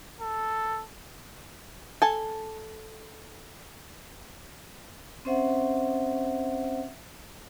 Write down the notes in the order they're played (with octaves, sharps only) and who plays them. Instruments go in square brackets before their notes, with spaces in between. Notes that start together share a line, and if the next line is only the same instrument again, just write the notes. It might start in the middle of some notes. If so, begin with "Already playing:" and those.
[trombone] A4
[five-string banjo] A4 G#5 A5
[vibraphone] C4 C#4 C5 E5 F#5